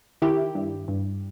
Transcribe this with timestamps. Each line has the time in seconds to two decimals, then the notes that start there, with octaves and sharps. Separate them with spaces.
0.22 D#3 E4 G4
0.55 G2
0.88 G2